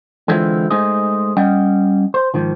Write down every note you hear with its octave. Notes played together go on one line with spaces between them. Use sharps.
D3 E3 G#3 C4 E4 F4
G#3 A3 D#4 G#4 C5 D#5
G3 C#4 D#5 F#5 G5
C5
G#2 D#3 F3